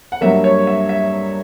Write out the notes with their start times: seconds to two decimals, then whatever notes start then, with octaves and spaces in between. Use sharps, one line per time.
0.12 F#5
0.21 G2 F#3 A#3 E5
0.44 C#5
0.67 E5
0.89 E5